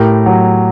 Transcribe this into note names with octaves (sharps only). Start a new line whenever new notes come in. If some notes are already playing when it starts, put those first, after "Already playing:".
Already playing: A2 G4 A#4
F#3